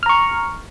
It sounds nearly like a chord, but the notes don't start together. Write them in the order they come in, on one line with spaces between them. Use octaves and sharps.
F6 A#5 C#6